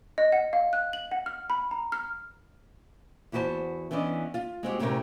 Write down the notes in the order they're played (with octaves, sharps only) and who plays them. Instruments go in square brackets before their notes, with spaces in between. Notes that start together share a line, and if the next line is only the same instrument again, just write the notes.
[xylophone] D#5
F#5
F5
F#6
F#7
F#5
F6
B5
A#5
F6
[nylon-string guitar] E2 E4 F#4 G4 C5 A5
E3 B3 C#4 D4 D#5
F4
G#3 C4 F#4 G4
D2 A2 C3 C#4 G4 A#4